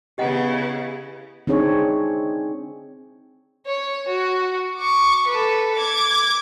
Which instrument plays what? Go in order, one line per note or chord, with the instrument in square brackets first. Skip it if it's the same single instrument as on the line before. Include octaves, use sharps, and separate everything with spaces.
[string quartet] C#3 B3 E4 [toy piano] G4 D#5 F#5
[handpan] C4 D4 D#4 G#4 C#5
[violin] C#5
F#4
C#6 D6
A4 B4
D6 G#6